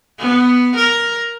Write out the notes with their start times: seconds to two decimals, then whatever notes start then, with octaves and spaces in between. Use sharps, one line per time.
0.19 B3
0.77 A#4